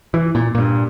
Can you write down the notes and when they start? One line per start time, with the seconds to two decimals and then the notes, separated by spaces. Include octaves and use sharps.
0.14 E3
0.35 A#2
0.55 G2 A#2